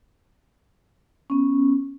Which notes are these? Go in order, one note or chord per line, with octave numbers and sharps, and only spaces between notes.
B3 C#4